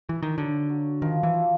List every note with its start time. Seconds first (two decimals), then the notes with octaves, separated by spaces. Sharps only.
0.09 E3
0.23 D#3
0.36 D3 F#3
0.69 F#3
1.02 D#3 F3
1.23 E3
1.33 F3